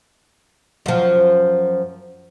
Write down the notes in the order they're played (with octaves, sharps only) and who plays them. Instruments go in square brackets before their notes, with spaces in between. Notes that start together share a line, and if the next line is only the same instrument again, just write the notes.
[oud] F#2 F3